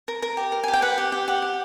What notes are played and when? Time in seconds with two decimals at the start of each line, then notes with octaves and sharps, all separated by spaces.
0.08 A#4
0.22 A#4
0.37 G4
0.52 A#4
0.64 G#5
0.68 G4
0.73 G5
0.82 B4 F#5
0.98 G4
1.12 G4
1.28 G4 F#5
1.42 G4